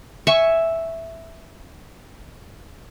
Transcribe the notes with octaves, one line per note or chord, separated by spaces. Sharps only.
E5 G#5 C#6